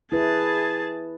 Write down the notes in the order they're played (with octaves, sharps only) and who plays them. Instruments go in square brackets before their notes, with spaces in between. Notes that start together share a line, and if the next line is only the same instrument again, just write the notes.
[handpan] E4 B4 [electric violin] G#4 A5